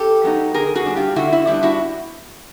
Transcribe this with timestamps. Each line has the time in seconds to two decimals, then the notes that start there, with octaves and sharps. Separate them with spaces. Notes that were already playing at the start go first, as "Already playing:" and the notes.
Already playing: G4 A4
0.24 F#3 B3 D#4
0.54 D3 G#4 A#4
0.76 F#4 G#4
0.86 G3 B3 D4
0.96 F4 G4
1.16 D3 E4 F#4
1.33 E4
1.47 G3 B3 D4 E4
1.63 E4 F#4